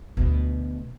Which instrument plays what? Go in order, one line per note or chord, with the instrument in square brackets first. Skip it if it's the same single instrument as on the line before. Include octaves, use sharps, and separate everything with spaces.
[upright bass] D2 B2